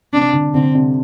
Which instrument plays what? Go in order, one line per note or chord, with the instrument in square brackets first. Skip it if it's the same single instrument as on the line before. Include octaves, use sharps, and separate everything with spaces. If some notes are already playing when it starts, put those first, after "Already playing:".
[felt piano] C3 [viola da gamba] D4
[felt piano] D3
[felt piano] D3 [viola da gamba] C4
[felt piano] C3